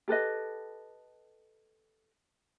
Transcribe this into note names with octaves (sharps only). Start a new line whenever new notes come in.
G4 A4 B4 D#5